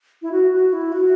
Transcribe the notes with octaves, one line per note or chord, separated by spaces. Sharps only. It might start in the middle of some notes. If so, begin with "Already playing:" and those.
E4
F#4
F#4
E4
F#4